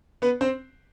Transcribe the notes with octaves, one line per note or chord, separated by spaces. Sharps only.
B3 B4
C4 C5